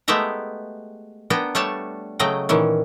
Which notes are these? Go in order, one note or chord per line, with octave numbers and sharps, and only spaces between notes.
G#3 A3 B3 G4 E5 A#5
B3 D4 G5 A#5
G3 A3 D4 C#5 A5
C#3 F#3 A3 D#5 G5 A#5
A#2 D#3 E3 C#4